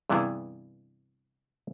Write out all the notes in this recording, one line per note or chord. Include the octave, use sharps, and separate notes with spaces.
G2 C3 E3 B3 E4 G#4